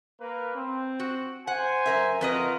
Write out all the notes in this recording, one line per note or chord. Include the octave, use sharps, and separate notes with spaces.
A#3 A#4 B4
C4
F#4
C5 F#5 G#5
F#2 A#4 E5
F2 F4 F#4 A#4 B4 D#5